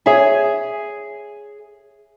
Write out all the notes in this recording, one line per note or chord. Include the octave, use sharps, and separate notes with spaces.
G#4 C#5 E5 G#5